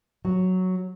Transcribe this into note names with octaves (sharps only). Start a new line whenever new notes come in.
F#3